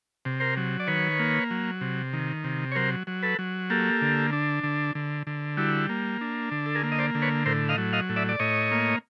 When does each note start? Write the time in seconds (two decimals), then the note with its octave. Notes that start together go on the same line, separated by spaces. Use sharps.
0.25 C3
0.40 A#4 C5
0.57 F#3
0.80 D5
0.87 D#3 B4 C#5
1.19 A#3
1.51 F#3
1.81 C3
2.13 D#3
2.44 C3
2.72 C#5
2.75 F#3 A#4 C5
3.07 F#3
3.23 A4 B4
3.39 F#3
3.70 A#3 G4 A4
4.02 D3
4.33 D4
4.64 D3
4.95 D3
5.27 D3
5.57 G3 E4 F#4
5.89 A#3
6.21 D4
6.52 D3
6.66 A4
6.75 G#4 A#4
6.83 A#3
6.92 D#5
6.98 C5 D5
7.15 D3
7.22 B4 C#5
7.46 A2 A#4 C5
7.69 D#5 F5
7.78 F#3
7.93 D#5 F5
8.09 A2
8.16 D5 E5
8.29 D5
8.39 A2 C#5 D#5
8.72 A#3